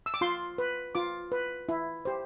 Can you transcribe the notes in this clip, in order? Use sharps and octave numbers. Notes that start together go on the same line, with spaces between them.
E6
D6
F4 C6
B4
F4 D6
B4
E4
G4 C5